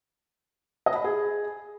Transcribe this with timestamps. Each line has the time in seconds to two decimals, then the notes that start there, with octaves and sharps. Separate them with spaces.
0.86 D#5
0.95 B5
1.04 G#4